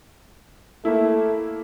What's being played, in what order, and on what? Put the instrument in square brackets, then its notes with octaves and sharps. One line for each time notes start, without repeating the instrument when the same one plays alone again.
[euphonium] A3 [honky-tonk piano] A#3 E4